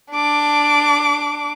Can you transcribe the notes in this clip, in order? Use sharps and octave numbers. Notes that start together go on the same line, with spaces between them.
D4 D6